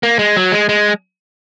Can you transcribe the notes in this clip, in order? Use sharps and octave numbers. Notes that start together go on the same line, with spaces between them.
A#3
G#3
F#3
G#3
G#3